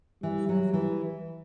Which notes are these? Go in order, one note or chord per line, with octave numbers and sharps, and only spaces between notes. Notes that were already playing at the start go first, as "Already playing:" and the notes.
E3 G3
F#3
E3